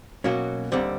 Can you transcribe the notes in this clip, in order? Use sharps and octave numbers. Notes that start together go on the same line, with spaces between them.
B2 F#3 A#3 C#4 F#4
D#2 D3 G3 C4